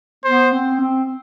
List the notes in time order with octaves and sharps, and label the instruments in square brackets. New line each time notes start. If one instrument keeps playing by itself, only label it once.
[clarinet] B3 [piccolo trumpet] C5
[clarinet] C4
C4